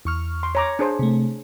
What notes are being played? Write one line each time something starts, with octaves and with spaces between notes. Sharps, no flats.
E2 C#6 F6
C6
C#5 A#5 D6
D4 G#4 C5
C3 A3